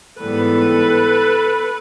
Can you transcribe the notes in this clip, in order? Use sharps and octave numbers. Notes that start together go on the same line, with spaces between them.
G#2 E3 G3 B3 A4 B4